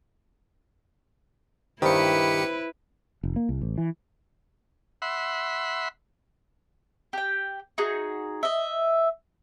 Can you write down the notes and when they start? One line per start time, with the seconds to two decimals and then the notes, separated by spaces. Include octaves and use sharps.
1.82 G2 D#3 E4 G4 B4 C5 B5 C#7
3.23 F1
3.36 A#3
3.49 C2
3.62 A1
3.78 E3
5.02 E5 F#5 B5 C6
7.13 G4 G5
7.78 D#4 F#4 G#4
8.43 D#5 E5